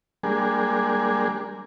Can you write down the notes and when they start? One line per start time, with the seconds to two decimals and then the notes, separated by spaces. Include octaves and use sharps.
0.23 G3 G#3 A#3 D4 G#4